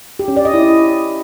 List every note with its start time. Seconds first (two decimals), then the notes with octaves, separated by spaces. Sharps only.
0.19 G4
0.28 C#4
0.37 D5
0.45 D#5
0.54 E4